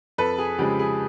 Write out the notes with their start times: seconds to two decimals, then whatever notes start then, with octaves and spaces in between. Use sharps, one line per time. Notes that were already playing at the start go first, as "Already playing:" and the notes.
0.18 F2 A4 B4
0.38 G#4
0.59 C#3 F3 G#3 G4
0.79 G#4